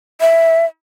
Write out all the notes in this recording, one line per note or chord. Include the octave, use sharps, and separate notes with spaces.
E5